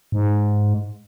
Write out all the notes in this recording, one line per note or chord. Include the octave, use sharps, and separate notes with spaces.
G#2